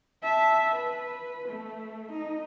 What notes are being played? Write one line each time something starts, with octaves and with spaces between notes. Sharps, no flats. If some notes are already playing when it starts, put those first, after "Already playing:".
E5 A5
B4
A3
D#4